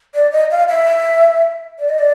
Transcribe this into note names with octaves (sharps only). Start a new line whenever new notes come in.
D5
D#5
F5
E5
D5
D#5
D5